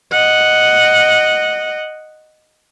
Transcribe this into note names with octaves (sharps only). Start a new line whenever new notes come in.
D#5 F#5